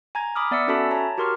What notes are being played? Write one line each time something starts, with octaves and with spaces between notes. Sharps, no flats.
G#5 A#5 G#6
B5 D6 D#6 F6
B3 D5 E5 E6 C#7
C#4 F#4 A4 E5 A5 B5
C#5 A5 A#5
F#4 G4 A#4 C6 C#6 F6